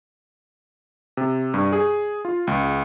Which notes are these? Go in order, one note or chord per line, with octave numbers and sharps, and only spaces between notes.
C3
G2
G#4
F4
C#2